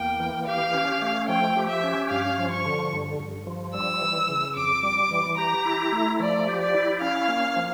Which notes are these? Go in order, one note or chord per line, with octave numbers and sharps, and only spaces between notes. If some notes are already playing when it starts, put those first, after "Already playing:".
Already playing: E2 A#3 G5
E3
G4 F5
C#4
A3
F3 G5
G4
E5
C#4
G2 F5
F3
C#6
D3
G2
G2
F3
G3 E6
E3
C#3
F2 D6
G3
E3
G4 A#5
E4
A3
F3 D5
G4
D5
E4
C#4 F5
A#3
F3